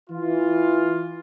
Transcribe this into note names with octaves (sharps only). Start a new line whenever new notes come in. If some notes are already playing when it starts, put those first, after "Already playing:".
E3 F4